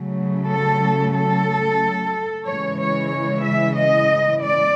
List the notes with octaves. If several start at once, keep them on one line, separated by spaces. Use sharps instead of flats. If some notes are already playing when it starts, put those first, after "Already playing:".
Already playing: C#3 F#3 A3
A4
A4
C#3 E3 G#3 C#5
C#5
C#5
E5
D#5
D5